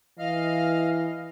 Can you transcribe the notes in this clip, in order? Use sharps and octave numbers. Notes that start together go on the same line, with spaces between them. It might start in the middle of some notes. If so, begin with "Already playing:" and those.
E3 D#5 F5 F6